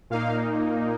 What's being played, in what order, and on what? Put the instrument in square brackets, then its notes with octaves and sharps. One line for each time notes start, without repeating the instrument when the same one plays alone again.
[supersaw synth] A#2 A#3 D#4 F5